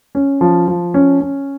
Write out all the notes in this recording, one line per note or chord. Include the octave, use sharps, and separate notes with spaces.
C#4
F3
F3
C#4
C#4